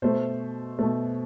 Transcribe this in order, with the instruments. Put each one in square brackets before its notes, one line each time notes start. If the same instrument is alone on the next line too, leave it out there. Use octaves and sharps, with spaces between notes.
[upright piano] B2 A3 C5
B2 A3